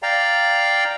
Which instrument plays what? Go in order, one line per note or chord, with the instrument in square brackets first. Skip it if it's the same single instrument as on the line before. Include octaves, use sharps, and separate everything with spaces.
[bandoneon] D5 F5 G5 A#5